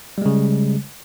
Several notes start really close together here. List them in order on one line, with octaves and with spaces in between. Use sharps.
G3 G#3 C#3